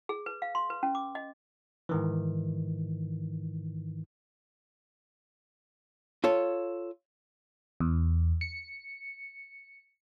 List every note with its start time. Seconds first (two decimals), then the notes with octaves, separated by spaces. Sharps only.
0.09 G#4
0.26 B4
0.42 F5
0.55 C6
0.70 B4
0.83 C#4
0.95 D6
1.15 D#5
1.89 G#2 D#3 E3
6.24 F4 A4 C#5
7.80 E2
8.41 C#7